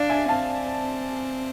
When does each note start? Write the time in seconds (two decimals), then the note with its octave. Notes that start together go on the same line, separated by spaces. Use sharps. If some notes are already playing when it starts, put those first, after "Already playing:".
Already playing: D4 D5 F5
0.10 E5 G#5
0.28 C4 F5 A5